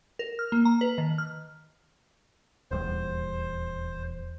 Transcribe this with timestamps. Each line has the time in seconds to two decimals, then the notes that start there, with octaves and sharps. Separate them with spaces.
0.19 A#4
0.39 F6
0.52 A#3
0.65 A#5
0.81 B4
0.98 D#3
1.18 F6
2.71 D#1 E2 G3 C5